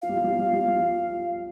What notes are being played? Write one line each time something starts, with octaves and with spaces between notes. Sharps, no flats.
F3 F5
G3
F3
G3
F3
G3
F3
G3
F3
G3
F3